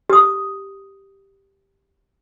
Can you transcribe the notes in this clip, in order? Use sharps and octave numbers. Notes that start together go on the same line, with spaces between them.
G4 D#6